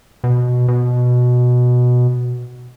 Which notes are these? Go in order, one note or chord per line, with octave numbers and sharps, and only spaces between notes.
B2
B2